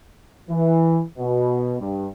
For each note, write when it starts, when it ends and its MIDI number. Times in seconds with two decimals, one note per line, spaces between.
0.49 1.01 52
1.18 1.75 47
1.80 2.08 43